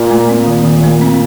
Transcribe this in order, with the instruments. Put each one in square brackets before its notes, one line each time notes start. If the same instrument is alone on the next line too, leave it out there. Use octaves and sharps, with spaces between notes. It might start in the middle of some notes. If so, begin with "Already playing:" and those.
Already playing: [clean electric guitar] A#2
[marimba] A3
C4
D#3
D#3
A3
C4